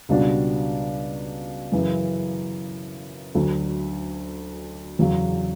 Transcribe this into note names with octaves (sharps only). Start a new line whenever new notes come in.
C#2 B2 G3 D4 F#4
F#2 C#3 E3
D2 D3 F#3
E2 C#3 F#3